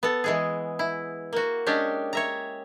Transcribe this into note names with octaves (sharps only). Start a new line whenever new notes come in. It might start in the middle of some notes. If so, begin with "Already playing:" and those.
B3 A4
E3 G#3 G#4
E4
A#3 F#4
G#3 C#4 D4 G4
C#5 E5 A#5